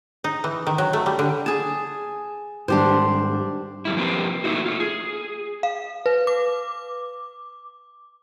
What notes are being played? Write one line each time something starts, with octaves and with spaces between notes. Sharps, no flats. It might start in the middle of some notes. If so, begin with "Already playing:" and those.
D#4
E3
D#3
F#3
A3
G3
D3
G#4 A5
G#2 D#3 G3 D4 G4 C5
F2 G3 E4
F3 A#3 C4 G4 B4
A3 A#3 D#4 E4 F#4
A3 F4
G#4
F5
B4
D6